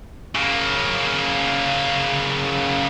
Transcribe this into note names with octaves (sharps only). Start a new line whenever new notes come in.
C#3 A#3